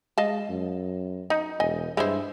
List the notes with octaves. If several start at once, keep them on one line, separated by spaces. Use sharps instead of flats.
G#3 D#5 F5 A5
F#2
D#4
E1 D#5 G#5
G2 G#3 E4 C5